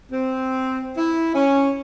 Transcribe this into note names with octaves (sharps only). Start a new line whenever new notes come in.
C4
E4
C#4